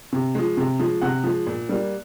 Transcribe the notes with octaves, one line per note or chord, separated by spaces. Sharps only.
C3
F3 G#3
C3
F3 G#3
C3 F#5
F3 G#3
A#2
G3 A#3